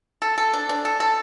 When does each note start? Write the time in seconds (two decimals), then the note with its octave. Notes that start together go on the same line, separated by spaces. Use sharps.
0.22 A4
0.38 A4
0.53 D4
0.69 D4
0.85 A4
1.00 A4